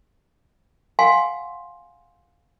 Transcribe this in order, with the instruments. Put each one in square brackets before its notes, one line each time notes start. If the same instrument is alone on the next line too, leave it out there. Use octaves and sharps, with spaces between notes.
[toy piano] F5 F#5 G#5 C6